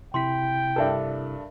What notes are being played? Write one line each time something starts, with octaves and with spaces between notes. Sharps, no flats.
C3 E4 G5 C6 B6
G2 D4 A4 A#4 E5